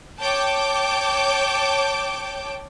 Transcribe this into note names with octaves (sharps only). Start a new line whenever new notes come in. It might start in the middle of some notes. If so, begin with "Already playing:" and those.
C#5 G5 A5 D6 G6 D7